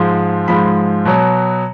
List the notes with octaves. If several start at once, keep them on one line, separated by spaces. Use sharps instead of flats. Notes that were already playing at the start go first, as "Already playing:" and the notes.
Already playing: G#2 F3 G#3
G#2 F3 G#3 B5
B2 F#3